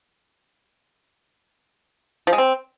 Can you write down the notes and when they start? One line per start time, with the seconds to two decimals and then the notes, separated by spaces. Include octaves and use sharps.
2.27 F3
2.33 G#3
2.38 C4